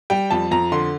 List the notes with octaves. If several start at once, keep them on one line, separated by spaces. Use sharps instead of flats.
G3 G5
F2 A5
F2 A#5
D3 C6